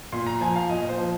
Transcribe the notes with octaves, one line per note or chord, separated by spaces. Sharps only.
A#2 C6
A#5
F3 G#5
F5
A#2 D#5
D#5
C5
F3